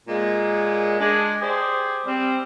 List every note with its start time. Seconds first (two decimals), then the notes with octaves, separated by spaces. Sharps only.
0.07 A#2 G#3
1.00 G#3 D4
1.41 G4 G#4 C5 D5
2.06 G3 C4